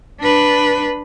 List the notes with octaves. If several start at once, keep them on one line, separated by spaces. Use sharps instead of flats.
D4 B4